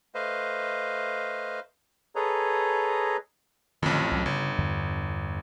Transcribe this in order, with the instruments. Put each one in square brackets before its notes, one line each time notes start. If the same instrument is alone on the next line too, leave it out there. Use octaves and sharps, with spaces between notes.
[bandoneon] A3 B4 C5 D#5 F5
G#4 A4 B4 C#5 D#5 A#5
[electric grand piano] A1 F2 [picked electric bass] D3 D#3
[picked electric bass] C2 F#3
[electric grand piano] G1 [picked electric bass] C#3
[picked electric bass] E2 G2 D3